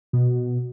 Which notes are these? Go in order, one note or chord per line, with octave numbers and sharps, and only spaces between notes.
B2